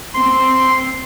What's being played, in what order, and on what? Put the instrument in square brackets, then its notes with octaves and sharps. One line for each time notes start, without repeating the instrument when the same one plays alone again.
[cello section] C4 [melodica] C6